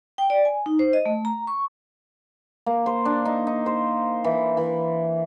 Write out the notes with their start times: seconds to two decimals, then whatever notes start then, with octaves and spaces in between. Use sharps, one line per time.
0.18 G5
0.30 D5
0.45 G#5
0.66 D#4
0.79 C5
0.93 D#5
1.06 A3
1.25 A#5
1.47 C#6
2.66 A#3
2.86 C5
3.05 D4
3.25 D#4
3.47 D#4
3.66 C5
4.24 E3
4.57 E3